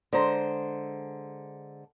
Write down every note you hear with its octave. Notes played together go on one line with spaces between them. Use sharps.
D3 G#3 C5 A#5